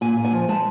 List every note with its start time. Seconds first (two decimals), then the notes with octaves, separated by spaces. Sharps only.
0.01 A#2 G#5
0.17 A#2
0.25 G#5
0.33 F3
0.48 G#3 A5